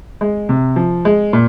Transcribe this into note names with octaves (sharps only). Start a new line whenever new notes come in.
G#3
C3
F3
G#3
A#2